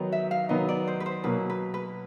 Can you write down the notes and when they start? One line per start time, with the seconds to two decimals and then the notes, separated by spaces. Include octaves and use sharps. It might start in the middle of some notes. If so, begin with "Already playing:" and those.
Already playing: D#3 F#3 B3 D#4
0.12 E5
0.31 F5
0.49 D#3 F#3 B3 D#4 D#5
0.69 D5
0.88 C5
1.00 B4
1.06 C5
1.24 B2 F#3 A#3 B4
1.50 B4
1.74 B4